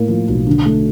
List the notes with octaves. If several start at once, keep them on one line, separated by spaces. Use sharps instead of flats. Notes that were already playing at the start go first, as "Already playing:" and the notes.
Already playing: A2 A#3
F3
B1
D3
A3